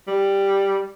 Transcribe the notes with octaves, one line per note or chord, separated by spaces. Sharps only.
G3